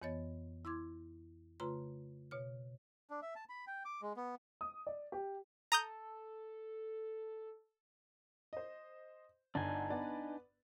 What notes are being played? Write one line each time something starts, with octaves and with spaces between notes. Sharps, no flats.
F2 E3 B3 C#5 D#5 A6
E4 C6 D6 G#6
C#3 A3 F4 B4 A#5 C6
B2 C#5 F6
D4
E5
A5
B5
G5
D6
G#3
B3
D#6
D5
G4
A4 A#5 D#6 G6
C5 D#5
G1 D3 D4 D#4 G#5
B3 B4 D5